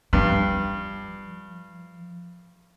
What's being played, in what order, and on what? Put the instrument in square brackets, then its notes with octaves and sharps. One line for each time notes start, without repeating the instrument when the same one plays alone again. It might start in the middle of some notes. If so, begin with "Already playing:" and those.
[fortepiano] G2 [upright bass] F3